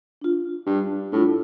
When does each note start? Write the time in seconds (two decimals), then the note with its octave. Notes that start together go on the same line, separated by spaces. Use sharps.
0.21 D4 F4
0.66 G2 G3
1.12 A2 D4 F4